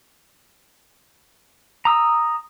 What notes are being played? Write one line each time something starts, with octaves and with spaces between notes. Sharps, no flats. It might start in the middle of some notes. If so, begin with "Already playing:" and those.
A#5 D#6 E6